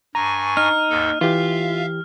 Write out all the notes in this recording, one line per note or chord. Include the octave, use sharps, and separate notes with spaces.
G2 G#5 A#5 C#6
D#4 F6
D#2 G#2 A4
E3 F4 G4 E5 F5